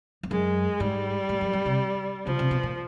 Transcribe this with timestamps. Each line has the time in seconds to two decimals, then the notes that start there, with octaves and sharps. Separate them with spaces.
0.23 F2
0.31 F#2 G#3
0.80 G#2 G3
1.29 A2
1.41 F#2
1.53 G2
1.66 C3
2.26 C#3 F3
2.39 C3
2.51 B2
2.63 A#2